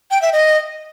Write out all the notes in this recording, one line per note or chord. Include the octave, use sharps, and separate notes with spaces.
G5
E5
D#5